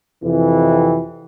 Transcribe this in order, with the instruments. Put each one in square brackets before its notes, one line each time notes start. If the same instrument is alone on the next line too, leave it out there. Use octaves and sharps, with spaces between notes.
[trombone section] F2 C3 E3